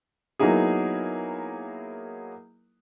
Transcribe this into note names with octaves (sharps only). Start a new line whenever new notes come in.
F#3 A#3 B3 D#4 E4 G#4